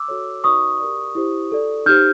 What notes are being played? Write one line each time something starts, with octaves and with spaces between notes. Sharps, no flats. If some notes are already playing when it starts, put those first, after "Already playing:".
Already playing: D6 E6
F#4 A4 C#5
D#4 F#4 B4 D5 C#6 D#6
G4 A#4 D5
E4 G4 C5
F#4 A4 D5
D#4 G4 C5 F6 G6